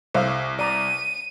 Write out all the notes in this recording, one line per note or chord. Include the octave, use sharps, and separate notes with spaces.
C2 C5 E5 F5
D5 A#5 D#7